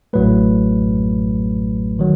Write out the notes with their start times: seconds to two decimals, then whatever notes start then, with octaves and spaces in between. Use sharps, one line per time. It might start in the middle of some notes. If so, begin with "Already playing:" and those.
0.13 A1 A2 F#3 A3 B4
1.99 D#3 F#3